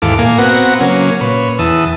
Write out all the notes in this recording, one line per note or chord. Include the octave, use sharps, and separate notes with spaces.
D#2 G#2 E3 A4 F5 D6
A#2 A#3 F5 G#5
B3 C4 F#4 F#5 A#5
C#3 F#3 A#3 C#4
A#2 B4 C#5
E2 E3 A5 D#6 E6